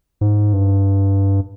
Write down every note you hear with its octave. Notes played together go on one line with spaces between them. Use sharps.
G#2
G2